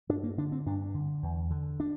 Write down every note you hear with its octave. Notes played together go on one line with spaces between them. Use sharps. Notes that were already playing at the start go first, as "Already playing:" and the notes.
G2 D4
A#3
D3 D4
C4
G2 D4
D3
E2
D3
D4